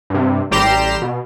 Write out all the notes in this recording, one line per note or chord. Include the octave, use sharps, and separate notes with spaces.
G2 C3
A1 G3 G4 A#5 C6 E7
B2